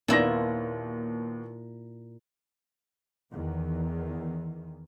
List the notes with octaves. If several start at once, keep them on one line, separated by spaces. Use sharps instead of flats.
D#2 A#2 B3 E4 F4 A#6
E2 D#3